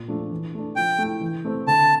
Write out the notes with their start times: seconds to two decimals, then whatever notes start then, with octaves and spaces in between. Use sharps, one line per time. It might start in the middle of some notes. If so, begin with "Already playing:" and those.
Already playing: A#2
0.08 F3 A3 D4
0.32 E3
0.54 A3 D4
0.76 F3 G5
0.98 A3 E4
1.21 E3
1.45 A3 C4
1.67 D3 A5